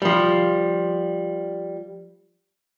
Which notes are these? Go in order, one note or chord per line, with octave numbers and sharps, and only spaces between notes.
F3 G3